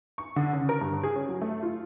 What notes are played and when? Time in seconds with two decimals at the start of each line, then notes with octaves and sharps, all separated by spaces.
0.18 C#6
0.36 D3
0.53 C#3
0.69 A#4
0.81 G2
1.03 G#4
1.16 C#4
1.29 F#3
1.42 A3
1.63 F4